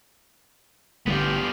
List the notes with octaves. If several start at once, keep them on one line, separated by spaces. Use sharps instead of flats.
A1 G2 D3 G3 B3 F4 G4